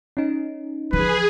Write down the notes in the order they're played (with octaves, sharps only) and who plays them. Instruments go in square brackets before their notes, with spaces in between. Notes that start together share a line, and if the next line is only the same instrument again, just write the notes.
[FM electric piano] C#4 D#4
[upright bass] E3 F3 [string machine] G#4 [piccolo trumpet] B4